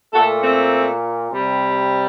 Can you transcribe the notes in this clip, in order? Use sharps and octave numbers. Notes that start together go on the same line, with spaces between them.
A#2 A3 F#4 A4
A3 C4
C3 G3